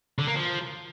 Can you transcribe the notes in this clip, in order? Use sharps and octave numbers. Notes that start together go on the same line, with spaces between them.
D3
A#3
F3